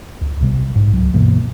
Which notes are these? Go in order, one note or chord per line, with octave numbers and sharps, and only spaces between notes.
D2
B1 C3 G3
G#2
C#2 F#3
G2 B2 E3 A#3